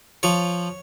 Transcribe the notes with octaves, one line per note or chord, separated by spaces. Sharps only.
F3 C#5